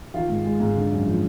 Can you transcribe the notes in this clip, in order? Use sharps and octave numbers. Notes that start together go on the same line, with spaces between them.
D#3 F4
G#2
G#3
G#2
D3
F#2
F3